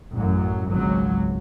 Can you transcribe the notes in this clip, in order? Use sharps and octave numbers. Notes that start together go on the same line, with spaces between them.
A1 F#2 F#3
G#1 C#2 F#3